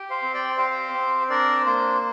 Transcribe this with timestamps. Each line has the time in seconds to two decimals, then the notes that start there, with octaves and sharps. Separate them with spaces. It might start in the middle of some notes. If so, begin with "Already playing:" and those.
Already playing: G4
0.10 C5 F5
0.22 C4
0.34 D5 G5
0.58 G4 C5 F5
0.94 C4
1.30 D4 A#4 D5
1.66 A#3 C5